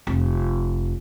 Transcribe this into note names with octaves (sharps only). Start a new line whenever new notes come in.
F1